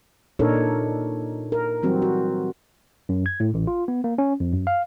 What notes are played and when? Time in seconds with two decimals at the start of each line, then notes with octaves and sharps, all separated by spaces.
0.39 A#2 D4 D#4 A4 A#4 C#5
1.52 A#4
1.83 E3 F#3 G3 C4 F#4
2.02 F#4
3.09 F#2
3.26 G#6
3.40 A2
3.54 A1
3.67 F4
3.88 B3
4.04 A#3
4.18 C#4
4.40 F2
4.53 F#2
4.67 F5